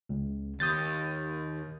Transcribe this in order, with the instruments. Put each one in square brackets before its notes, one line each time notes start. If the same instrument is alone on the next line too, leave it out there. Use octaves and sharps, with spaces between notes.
[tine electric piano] C#2
[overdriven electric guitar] D#2 [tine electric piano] D#6 G6 A6